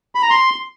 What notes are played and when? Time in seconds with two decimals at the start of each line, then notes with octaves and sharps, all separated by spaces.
0.15 B5
0.22 A#5
0.30 C6